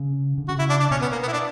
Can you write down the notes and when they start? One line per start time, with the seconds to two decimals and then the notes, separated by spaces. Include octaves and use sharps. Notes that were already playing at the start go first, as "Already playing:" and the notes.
Already playing: C#3
0.38 D3
0.48 C#3 F#4
0.59 E4
0.70 D4
0.80 D4
0.91 B2 C#4
1.02 B3
1.12 A#3
1.23 B3
1.28 E4
1.33 D4